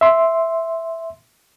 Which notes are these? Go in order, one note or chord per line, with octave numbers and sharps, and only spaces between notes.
E5 C6